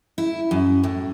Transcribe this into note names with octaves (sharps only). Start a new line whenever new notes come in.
E4
F#2
A2